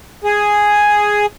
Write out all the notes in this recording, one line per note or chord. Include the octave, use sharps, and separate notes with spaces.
G#4